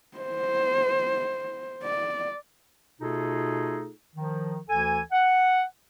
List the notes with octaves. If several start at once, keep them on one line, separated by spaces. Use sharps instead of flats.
C5
D5
B2 A3 D#4 F4 G#4 A4
D#3 F3
D2 E3 A4 G#5
F#5